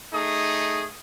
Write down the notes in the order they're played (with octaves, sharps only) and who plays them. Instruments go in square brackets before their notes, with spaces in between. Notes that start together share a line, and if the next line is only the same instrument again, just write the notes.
[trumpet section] A3 D#4 G#4 D#6